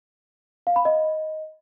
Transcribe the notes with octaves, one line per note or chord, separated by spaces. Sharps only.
F5
B5
D#5